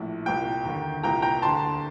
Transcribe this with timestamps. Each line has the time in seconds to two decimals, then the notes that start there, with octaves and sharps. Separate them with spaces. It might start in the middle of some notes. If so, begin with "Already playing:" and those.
Already playing: A#1 A2
0.25 C2 A#2 G5
0.65 D#2 D3
1.03 C2 A#2 G5 A#5
1.22 G5 A#5
1.42 D2 D3 A5 C6